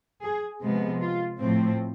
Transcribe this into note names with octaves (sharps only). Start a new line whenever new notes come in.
G#4
C3 F3 G#3 B3
F4
A2 F3 A3 C4